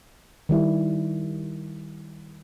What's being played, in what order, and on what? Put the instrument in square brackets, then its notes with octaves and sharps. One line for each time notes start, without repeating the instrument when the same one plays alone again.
[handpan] D#3 G3 E4